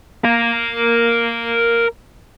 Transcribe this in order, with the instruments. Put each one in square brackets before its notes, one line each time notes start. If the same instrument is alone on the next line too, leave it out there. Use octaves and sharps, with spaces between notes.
[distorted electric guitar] A#4 F5